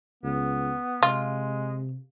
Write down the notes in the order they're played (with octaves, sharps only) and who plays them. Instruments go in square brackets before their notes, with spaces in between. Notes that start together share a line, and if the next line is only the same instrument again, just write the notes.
[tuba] C#2 [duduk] B3
[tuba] C3 [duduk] G#3 [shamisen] F4